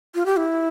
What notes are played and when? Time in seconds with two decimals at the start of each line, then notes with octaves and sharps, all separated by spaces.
0.15 F4
0.26 G4
0.37 E4